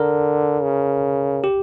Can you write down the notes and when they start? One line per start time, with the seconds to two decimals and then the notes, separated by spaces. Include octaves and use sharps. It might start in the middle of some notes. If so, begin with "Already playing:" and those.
Already playing: D3 A#4
0.63 C#3
1.44 G4